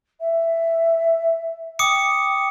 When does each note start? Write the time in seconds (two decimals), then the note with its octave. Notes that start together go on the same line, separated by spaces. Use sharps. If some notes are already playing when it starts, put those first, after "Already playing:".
0.20 E5
1.79 G5 D6 D#6 C#7